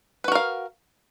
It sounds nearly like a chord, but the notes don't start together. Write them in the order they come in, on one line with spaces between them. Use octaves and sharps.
B4 F#4 A#4 F5